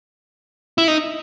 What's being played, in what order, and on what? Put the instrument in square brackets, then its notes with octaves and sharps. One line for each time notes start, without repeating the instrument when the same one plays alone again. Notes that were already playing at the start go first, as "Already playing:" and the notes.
[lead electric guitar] E4
D#4